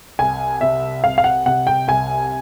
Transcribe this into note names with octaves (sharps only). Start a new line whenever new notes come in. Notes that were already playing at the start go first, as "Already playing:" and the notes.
C2 G#5
C3 E5
C2 F5
F5
F#5
C3 F#5
G5
C2 G#5